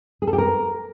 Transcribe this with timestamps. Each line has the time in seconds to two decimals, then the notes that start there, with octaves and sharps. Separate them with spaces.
0.22 G#4
0.27 A4
0.33 G4
0.38 A#4